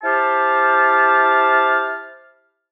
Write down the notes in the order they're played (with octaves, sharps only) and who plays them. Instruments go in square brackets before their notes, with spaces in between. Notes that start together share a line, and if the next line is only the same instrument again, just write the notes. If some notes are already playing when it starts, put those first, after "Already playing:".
[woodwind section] E4 G4 C5 A5 F6